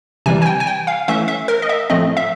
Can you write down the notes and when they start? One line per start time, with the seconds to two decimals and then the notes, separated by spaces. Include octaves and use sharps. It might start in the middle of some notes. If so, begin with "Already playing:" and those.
0.26 C3 E3 G3 G#5
0.42 G#5
0.46 G5
0.60 G#5
0.67 G5
0.87 F5
1.08 E3 A3 C#4 E5
1.28 E5
1.48 A#4
1.62 D#5
1.69 E5
1.90 A2 F3 A3 C4 D#5
2.17 E5